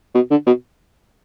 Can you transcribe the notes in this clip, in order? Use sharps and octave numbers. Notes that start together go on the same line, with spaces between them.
B2
D3
B2